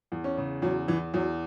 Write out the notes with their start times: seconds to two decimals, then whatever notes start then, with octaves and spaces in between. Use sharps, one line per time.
0.12 E2
0.24 C#4
0.37 C#3
0.62 E2 F#3
0.88 E2 E3
1.14 E2 F#3